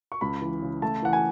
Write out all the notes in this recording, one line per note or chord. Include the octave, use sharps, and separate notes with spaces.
C#6
C#2 B5
E3
C#3
A3 A5
E3 F#5
G#5